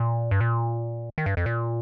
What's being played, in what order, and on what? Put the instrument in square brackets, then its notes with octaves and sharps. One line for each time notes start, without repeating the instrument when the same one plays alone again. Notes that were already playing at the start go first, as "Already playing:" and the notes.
Already playing: [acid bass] A#2
G2
A#2
D#3
G2
F2
A#2